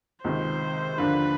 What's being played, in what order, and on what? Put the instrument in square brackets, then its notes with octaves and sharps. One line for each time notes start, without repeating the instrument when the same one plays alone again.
[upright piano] C#2 C3 D#3 [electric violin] C5
[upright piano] D#2 D3 F3 A#3 D4 [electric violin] B4